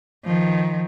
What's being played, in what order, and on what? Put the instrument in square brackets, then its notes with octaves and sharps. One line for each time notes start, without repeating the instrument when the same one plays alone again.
[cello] D#3 F3